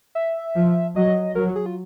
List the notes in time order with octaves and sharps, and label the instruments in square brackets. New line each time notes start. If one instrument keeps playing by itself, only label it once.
[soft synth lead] E5
[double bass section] F3
[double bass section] F#3 [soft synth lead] D#5
[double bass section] F#3 [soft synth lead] A#4
[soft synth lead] G#4
F4